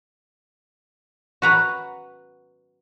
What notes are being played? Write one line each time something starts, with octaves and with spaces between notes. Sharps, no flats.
F#4 B4 A#5